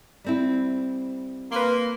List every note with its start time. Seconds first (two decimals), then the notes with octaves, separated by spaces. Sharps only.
0.24 G3 C4 E4
1.52 A#3 B4 C6